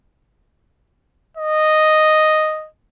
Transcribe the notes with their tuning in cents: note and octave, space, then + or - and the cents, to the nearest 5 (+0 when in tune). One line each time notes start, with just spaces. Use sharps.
D#5 -5